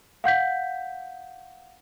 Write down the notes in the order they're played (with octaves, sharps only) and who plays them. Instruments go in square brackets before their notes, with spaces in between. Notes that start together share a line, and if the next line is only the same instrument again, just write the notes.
[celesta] F5 F#5 G6 B6